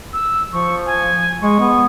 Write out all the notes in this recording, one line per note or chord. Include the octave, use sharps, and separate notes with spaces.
E6
F3 C#6
G#5
G#3 C#6
B3